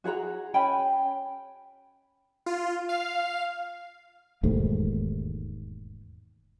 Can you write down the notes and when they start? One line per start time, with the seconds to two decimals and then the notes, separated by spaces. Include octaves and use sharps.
0.04 F#4 G#4 F#5 A#5
0.54 C#4 G5 G#5 B5
2.46 F4
2.89 F5
4.43 E1 D#2 G#2 A3